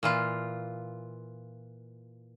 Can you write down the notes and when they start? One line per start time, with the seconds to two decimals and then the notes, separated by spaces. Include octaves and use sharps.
0.03 A#2 E3 F4